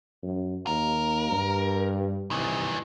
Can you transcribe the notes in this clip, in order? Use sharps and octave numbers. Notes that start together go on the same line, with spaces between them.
F#2
D#2 A#4
G2
C2 D#3 E3